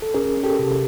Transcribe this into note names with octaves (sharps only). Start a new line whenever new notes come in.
A4
C#4 G#4 A#4
C#4
G4 A4
C3